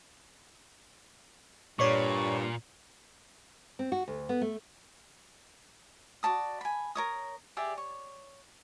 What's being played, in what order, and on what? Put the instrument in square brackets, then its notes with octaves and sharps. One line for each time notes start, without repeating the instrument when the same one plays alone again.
[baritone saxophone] G2 [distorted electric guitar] A#2 [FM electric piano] C#5 D5 C#6
[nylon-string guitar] C4
F#4
D2
B3
A3
[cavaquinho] F#4 D5 A5 D#6
G#5 B5
A#4 C#5 D#6
G4 G#4 D5 E5
C#5